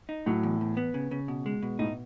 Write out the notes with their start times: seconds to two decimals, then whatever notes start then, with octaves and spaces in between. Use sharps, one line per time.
0.09 D#4
0.26 A2 F#3
0.43 E2
0.61 E2
0.77 B3
0.94 C#3
1.11 C#3
1.28 B2
1.46 G#3
1.62 B2
1.79 A2 D#4